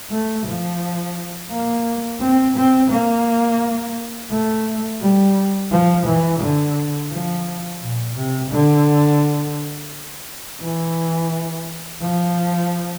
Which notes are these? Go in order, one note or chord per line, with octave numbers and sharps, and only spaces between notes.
A3
F3
A#3
C4
C4
A#3
A3
G3
F3
E3
D3
F3
A#2
C3
D3
E3
F3